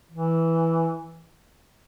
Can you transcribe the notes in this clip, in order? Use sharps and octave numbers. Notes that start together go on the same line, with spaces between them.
E3